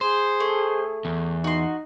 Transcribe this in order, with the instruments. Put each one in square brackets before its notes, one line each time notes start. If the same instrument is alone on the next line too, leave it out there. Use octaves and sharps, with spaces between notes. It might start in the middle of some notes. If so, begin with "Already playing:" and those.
[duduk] G#4 [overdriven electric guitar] C5
[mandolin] A3
[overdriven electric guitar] E2
[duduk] D#4 [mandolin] F#4 C6